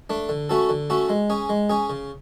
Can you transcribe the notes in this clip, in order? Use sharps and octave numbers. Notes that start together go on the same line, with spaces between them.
A3 D4
D3
A3 C#4 F#4 A4
D3
A3 C#4 F#4 A4
G#3
C#4 G#4
G#3
C#4 G#4
C#3